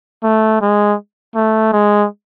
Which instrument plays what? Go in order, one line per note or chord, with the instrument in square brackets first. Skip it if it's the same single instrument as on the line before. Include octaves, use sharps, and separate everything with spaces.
[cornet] A3
G#3
A3
G#3